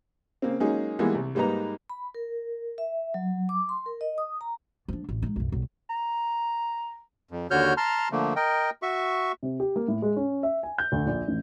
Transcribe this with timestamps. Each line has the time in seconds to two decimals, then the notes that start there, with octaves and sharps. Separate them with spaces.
0.42 C#3 A#3 C4
0.60 F#3 G#3 A#3 C#4 D#4 G#4
0.99 E3 G3 G#3 A#3 B3
1.15 C2
1.35 G#2 G3 A#3 D#4 B4 A#5
1.90 B5
2.15 A#4
2.78 E5
3.14 F#3
3.49 D6
3.69 C6
3.86 A#4
4.01 D#5
4.18 D#6
4.41 A#5
4.88 F3 D4
5.09 A1 F#3
5.22 G#3 D#4
5.36 B1 F#2
5.52 B1 G3
5.90 A#5
7.31 F2
7.51 D#2 D3 F#4 C#5 F6 G6
7.77 A5 A#5 C6 F6
8.12 D3 F3 A3 A#3
8.36 A#4 D#5 G5
8.82 F#4 E5 C#6
9.43 C3
9.60 G4
9.76 A#3
9.88 A2
10.02 G#3
10.16 C#4
10.43 E5
10.63 G#5
10.78 G6
10.92 D2
11.06 A#1
11.28 A1